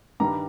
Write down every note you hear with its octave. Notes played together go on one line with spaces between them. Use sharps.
G2 D#3 G3 A#5